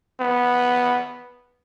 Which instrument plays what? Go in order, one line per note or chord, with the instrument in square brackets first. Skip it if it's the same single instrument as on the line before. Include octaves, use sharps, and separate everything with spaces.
[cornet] B3